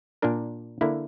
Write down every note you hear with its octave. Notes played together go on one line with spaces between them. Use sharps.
A#2 A#3 D4 A#4
D3 A#3 E4